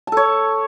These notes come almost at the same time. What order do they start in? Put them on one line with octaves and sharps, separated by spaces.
A5 A4 C#5